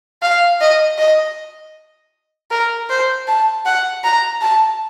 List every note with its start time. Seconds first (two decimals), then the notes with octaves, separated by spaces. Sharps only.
0.22 F5
0.61 D#5
0.98 D#5
2.51 A#4
2.90 C5
3.28 A5
3.66 F#5
4.04 A#5
4.42 A5